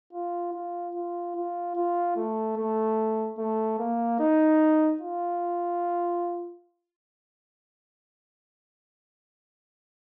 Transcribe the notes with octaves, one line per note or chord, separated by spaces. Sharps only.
F4
F4
F4
F4
F4
A3
A3
A3
A#3
D#4
F4